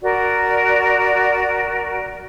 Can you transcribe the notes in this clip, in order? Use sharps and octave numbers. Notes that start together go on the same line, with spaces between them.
F#4 A#4 D5